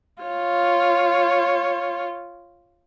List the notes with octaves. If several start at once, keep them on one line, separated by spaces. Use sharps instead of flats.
F4 C#5